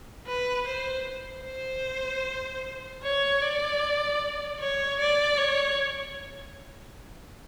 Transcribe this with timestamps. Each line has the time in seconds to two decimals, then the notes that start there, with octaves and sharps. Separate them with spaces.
0.27 B4
0.66 C5
1.45 C5
3.03 C#5
3.41 D5
4.60 C#5
4.99 D5
5.37 C#5